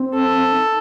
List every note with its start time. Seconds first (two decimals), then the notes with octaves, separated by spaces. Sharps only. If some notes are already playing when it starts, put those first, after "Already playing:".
Already playing: C4
0.14 A4
0.52 D#4